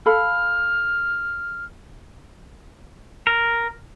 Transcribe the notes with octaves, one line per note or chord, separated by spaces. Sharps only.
A4 F5 B5 F6
A#4